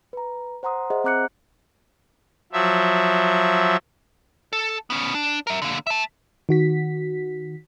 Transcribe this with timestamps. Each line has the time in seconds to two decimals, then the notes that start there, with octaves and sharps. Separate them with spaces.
0.13 B4 A#5
0.63 C5 F#5 A#5 C6 D#6
0.90 G#4 C5 D#5 E5 F#5
1.04 C4 A#5 D6 F#6 G6 C#7
2.52 F3 F#3 E5
4.53 A4
4.90 B3 C#4
5.14 D4
5.47 A#4 E5
5.62 D3 A#3
5.87 E5 A5
6.49 D#3 F#4 B6